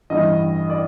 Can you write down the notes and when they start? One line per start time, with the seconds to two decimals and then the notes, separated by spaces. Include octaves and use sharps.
0.10 A1 G2 E3 D#5
0.70 D5